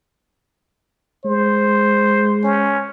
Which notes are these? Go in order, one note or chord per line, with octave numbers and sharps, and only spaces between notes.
G#3 C5
C#4